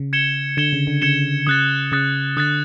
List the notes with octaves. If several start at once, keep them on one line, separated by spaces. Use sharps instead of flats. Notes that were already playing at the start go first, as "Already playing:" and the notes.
Already playing: C#3
G#6 C#7 E7 G7
D3 G#6 C#7 E7 G7
C#3
D3
C#3 G#6 C#7 E7 G7
C#3 D#6 F#6 A6
C#3 D#6 F#6 A6
D3 D#6 F#6 A6